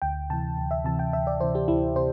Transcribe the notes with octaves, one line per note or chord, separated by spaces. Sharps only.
D2 G5
C3 E3 A5
D2
E5
C3 E3 A5
G5
D2 E5
D5
C3 E3 C5
G4
D2 E4
C3 C5